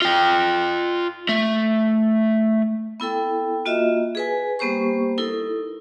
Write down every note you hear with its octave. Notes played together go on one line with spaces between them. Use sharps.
F4 G5
A3
B3 E4 A4 G5
A#3 F4 F#4 D#5 E5
G#4 B4 G#5
G3 A#3 B3 G4 C5 C#6
D#4 E4 A4 A#4